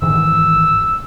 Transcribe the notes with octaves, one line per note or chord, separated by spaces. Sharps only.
G#2 D#3 E3 E6